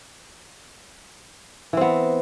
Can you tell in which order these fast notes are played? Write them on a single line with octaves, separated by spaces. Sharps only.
E3 C4 B3